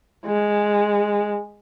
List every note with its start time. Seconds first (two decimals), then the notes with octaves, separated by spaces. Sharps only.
0.26 G#3